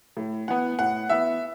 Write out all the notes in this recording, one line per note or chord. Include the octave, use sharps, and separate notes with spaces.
A2
E3 B3 F#5
A2 F#5
E3 B3 E5